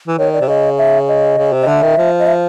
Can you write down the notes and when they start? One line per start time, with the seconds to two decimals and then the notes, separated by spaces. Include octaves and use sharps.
0.08 E3
0.18 D#3 C#5
0.33 D5
0.41 C3
0.48 C#3 D#5
0.78 E5
1.08 D#5
1.38 C#3
1.53 C3
1.62 D#5
1.68 D3 E5
1.83 D#3
1.97 F3
2.19 D#5
2.27 E5